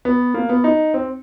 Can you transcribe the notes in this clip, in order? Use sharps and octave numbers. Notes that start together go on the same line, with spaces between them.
B3
A#3
B3
D#4
C4